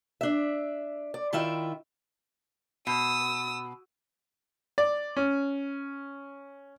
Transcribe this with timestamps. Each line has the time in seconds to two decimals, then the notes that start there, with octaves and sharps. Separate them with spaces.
0.21 D4 E5
1.14 D5
1.33 D#3 E4 F4 E5 G5
2.87 B2 D#6 E6
4.78 D5
5.17 C#4